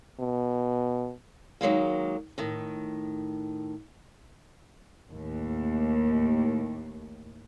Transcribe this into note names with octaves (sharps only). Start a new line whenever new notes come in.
B2
D#3 F#3 G#3 A#3
A2 D#3
D#2 A2